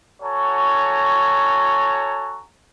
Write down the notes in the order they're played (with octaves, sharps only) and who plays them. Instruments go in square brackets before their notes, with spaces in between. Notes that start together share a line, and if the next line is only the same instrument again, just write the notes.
[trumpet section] F#4 A4 C#5 G#5 A#5